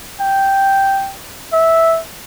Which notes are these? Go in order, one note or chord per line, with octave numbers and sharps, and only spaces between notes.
G5
E5